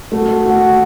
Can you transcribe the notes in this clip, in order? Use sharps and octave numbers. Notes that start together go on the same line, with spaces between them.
A3 F#4
F#4